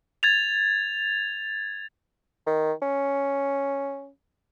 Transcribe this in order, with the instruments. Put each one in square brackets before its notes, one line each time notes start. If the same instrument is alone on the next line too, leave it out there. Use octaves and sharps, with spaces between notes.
[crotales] G#6 A6 F7
[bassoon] D#3
C#4